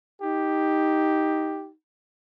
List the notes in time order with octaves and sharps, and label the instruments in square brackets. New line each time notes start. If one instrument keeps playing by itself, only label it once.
[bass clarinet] D#4 [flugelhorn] G4